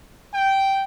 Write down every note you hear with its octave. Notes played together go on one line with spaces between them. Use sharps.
G5